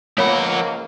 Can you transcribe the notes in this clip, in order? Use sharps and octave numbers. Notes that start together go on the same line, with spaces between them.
C#2 G#2 F3 A#3 C#5 F#5 B5